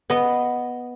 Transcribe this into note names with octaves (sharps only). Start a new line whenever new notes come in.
B3 D#5